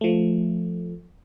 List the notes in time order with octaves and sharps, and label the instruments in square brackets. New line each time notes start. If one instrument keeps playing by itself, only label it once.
[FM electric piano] F3 A3